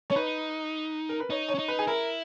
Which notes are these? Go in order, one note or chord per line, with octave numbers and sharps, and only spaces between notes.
C#4 C#5
D#4 B4
A#4
B4
D#4 C#5
C#5
C#4
D#4
B4
G#4
E4 A#4